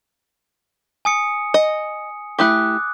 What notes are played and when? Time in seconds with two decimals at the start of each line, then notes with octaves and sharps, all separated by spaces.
1.05 G#5 D#6 C#7
1.54 D#5
2.39 A3 E4 G4 D6 D#6 F#6